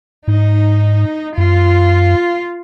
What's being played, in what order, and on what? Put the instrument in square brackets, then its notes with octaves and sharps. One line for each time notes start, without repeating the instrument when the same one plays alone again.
[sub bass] G#2 [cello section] D#4
[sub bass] F#2 [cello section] F4